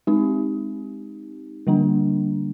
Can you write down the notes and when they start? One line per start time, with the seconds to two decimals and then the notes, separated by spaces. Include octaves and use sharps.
0.07 G#3 C4 D#4 G4
1.67 D3 G3 A#3 D4